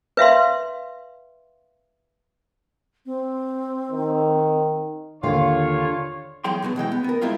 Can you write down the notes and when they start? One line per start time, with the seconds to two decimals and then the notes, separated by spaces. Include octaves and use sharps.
0.17 B4 E5 F5 C6
3.06 C4
3.92 D#3
5.23 D#2 D3 D4 F4 C#5 F5
6.44 E2 F#3 G#4 G5 C6
6.62 B2 D3 F#3 B3
6.76 B2 E3 G#3 G5
6.92 B3
7.04 B3 A#4
7.21 G#3 C4 E4 F4 A#4